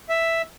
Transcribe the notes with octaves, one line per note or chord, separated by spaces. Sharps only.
E5